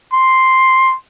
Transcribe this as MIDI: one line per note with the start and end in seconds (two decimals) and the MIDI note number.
0.13 0.95 84